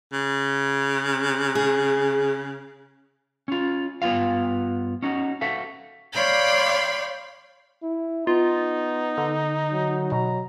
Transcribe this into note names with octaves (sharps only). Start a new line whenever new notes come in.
C#3
G#4
C#4 F4
G2 B3 F4 F#4 F5
C#4 D#4 F#4
F#4 A4 E5 F5
C#5 D5 F5 G5 B5 C6
E4
B3 D#4 F4
D3
F#3
B2 A#5